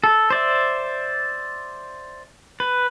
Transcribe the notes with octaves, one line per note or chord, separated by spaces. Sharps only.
A4
C5 D5 E5
B4